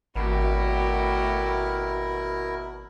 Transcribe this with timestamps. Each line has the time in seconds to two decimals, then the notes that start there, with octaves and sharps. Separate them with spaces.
0.16 G#1 B2 A3 E4 F#4 G4 A#4